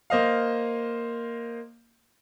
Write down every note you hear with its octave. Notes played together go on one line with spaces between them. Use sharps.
A#3 C5 D#5 F5